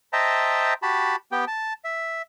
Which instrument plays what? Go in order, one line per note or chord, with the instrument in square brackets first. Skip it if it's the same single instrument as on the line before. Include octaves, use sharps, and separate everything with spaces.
[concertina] C5 D#5 E5 G5 A5 A#5
F#4 G4 A5 B5
B3 G4 G5
A5
E5